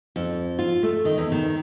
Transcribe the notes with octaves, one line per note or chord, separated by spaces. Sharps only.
F2
F4
A3
D#3
E2
D#3